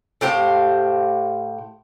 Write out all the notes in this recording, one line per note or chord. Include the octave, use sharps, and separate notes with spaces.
A2 G4 C5 F5